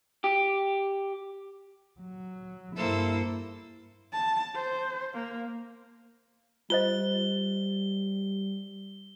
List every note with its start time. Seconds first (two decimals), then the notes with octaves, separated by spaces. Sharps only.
0.24 G4
2.00 F#3
2.76 G2 A#3 E4 A4 C5
4.13 A5
4.55 C5
5.14 A#3
6.70 G3 F4 C5 D#5 G7